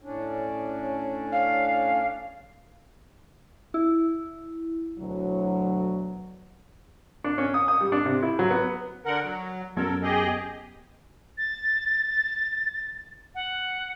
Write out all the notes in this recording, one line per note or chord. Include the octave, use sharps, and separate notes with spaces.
A2 C#4 D4
F5
E4
D2 B2 F#3
D4
C#4
D#6
D#6
G3
D4
C3
E4
F#3
B3
D3 A#4 F#5
F#3
F#2 B3 A4 A#4 G#6
G4 G#4 D#5
A6
F#5